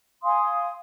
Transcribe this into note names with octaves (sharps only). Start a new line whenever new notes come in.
F5 G#5 C6 D#6